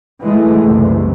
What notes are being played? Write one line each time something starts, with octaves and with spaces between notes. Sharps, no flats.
E3 G#3 A3
F#1 C2 C3